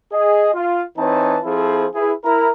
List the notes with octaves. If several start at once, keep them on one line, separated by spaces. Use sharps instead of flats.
G#4 D#5
F4 F5
E3 C4 D#4 B4 C#5 A5
F3 C4 E4 G#4 A4 C5
E4 G#4 B4
E4 A#4 A#5